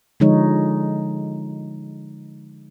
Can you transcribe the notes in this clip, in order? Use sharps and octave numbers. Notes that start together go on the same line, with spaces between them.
D3 F3 G#3 D#4 C#5